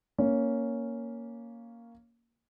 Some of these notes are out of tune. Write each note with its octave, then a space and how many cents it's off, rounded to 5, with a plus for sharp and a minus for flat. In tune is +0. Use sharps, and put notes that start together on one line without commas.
A#3 +0 C#4 +5